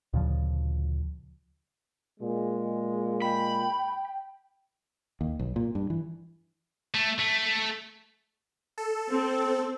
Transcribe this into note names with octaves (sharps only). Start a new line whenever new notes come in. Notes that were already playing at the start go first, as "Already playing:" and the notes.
D2 A#2 C#3 F3
A#2 G#3
G5 B5
D#2
B1
A#2
G2
E3
A3
A3
A4
C4